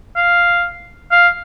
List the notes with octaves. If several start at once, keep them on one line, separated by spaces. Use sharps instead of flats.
F5
F5